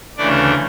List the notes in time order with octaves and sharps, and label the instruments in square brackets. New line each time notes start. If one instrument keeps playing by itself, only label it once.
[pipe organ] D2 C#3 E3 A3 D4 D5